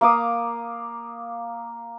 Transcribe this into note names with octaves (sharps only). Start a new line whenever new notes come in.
A#3 F5 D6 D#6